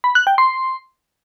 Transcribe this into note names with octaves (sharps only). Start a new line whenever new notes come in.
B5
F#6
G5
C6